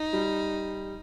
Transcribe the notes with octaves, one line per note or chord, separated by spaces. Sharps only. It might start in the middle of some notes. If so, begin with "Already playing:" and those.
Already playing: D#4
G3